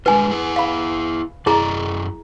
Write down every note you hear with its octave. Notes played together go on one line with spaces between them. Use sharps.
G#3 D4 F4 B4 G#5
E4 G#4
F5 B5
F#2 E4 G#4 D5 D#5 A#5